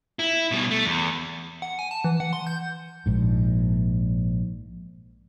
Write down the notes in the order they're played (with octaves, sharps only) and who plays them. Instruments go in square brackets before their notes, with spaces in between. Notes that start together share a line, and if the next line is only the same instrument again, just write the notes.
[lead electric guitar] E4
B2 G3
A3
E2
[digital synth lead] F#5
G#5
A5
E3
F#5
C6
G6
[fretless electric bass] A#1 G#2